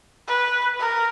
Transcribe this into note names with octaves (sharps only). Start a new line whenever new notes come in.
B4
A#4